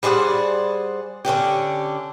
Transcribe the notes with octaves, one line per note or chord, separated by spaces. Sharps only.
G3 G#4 C5 D5 F#5
D3 C#4 D4 G4